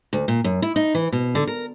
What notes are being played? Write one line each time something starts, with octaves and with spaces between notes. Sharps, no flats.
D2
A#2
F#2
E4
D#4
E3
B2
D3
A#4